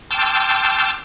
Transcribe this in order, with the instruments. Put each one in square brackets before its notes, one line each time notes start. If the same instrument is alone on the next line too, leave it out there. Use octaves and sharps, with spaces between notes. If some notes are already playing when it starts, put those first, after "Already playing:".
[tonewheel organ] G5 A5 C6 D6 E6 F6